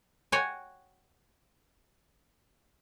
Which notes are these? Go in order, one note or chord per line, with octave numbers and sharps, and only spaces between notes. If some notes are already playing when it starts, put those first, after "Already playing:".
F#4 C#5 G5 G#5